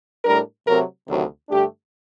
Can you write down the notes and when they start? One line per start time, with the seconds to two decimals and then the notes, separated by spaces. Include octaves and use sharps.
0.24 A2 G3 D4 A#4
0.66 C3 F#3 A3 C4 A#4
1.07 D2 C3 D#3 F#3
1.49 G2 D3 A3 D4 G4